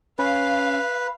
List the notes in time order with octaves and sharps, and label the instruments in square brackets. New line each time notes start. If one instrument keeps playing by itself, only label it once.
[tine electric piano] C#4 [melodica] B4 [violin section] F5